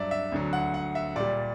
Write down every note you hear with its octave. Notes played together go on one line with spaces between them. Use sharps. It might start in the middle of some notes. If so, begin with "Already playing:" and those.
Already playing: G2 F#3 D5 E5
E5
D2 D3 F#3
F#5
F#5
E5
A#2 G3 D5